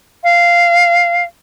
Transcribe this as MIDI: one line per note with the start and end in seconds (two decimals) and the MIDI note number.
0.24 1.24 77